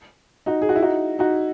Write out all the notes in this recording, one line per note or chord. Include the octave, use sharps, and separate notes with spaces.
D#4 F#4
G#4
F#4
E4
D#4 F#4
D#4 F#4